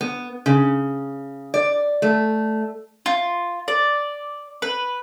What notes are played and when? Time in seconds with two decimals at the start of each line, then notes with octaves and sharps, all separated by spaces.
0.01 B3
0.46 C#3
1.54 D5
2.02 A3
3.06 F4
3.68 D5
4.62 B4